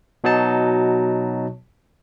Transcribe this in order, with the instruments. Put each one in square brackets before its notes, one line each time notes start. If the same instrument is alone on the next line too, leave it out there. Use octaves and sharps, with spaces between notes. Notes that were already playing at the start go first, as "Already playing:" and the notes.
[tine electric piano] B2 F#3 D#4 A5